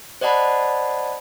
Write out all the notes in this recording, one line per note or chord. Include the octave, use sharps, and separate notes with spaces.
C5 D5 D#5 F#5 A5 B5